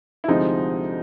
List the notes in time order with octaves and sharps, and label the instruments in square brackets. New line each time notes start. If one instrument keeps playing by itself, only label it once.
[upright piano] E4
D2 C3 F3 G#3 C4 D#4